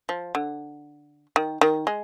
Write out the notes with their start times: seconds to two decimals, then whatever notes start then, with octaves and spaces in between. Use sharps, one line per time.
0.09 F3
0.35 D3
1.36 D#3
1.61 D#3
1.87 G#3